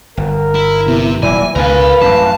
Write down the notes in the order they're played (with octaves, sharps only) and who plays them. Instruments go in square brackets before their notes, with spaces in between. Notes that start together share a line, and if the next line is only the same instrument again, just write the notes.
[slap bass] G1 [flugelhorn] A#4
[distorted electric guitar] E4
[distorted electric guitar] C3 [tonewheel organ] B3 E4
[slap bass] D#1 A#2 F#3 [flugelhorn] E4 [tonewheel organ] D5 [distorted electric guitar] G#5
[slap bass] C#2 B2 D3 [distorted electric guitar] A#4 G#5 [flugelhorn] B4 [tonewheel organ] F5
[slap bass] A1 F#2 C3 [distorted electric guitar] A5